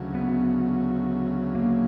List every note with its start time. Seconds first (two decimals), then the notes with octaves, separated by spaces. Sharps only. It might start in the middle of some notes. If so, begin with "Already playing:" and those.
Already playing: D2 C#3 F#3
0.15 B3
1.55 A#3